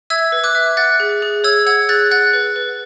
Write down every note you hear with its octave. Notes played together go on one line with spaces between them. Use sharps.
E5 E6 G#6
B4
D6 F#6
E5
F#5 F#6 A6
G#4
G#4
C#5 E6 G#6
F#5 E6 G#6
G#4 F#6 A6
F#5 F#6 A6
B4
B4